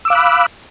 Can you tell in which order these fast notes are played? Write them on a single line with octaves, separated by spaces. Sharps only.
E6 D6 F5 F#6 B5